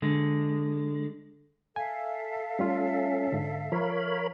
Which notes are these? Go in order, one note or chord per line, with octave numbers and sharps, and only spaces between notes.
D3 G#3
A4 E5 F5 G#5
G3 A3 C#4 F4
G#2 D3
F3 A#4 C#5 B5